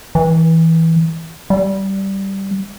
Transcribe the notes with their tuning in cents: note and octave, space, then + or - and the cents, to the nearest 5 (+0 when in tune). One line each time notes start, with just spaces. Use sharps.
E3 -15
G3 -10